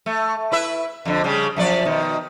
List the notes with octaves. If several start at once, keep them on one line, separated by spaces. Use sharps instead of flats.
A3
E4 B4 E5
F2 D3
C#3 G3
F#2 F3 D5
B2 D#3